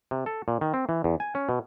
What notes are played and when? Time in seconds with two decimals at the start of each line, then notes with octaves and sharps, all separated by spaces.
0.11 C3
0.26 A4
0.48 A#2
0.61 D#3
0.74 C4
0.89 E3
1.04 E2
1.20 G#5
1.35 C#4
1.49 B2